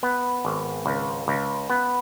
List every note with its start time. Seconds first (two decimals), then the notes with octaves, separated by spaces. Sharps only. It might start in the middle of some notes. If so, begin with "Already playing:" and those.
0.03 B3
0.45 G#1
0.86 C#2
1.28 C#2
1.70 B3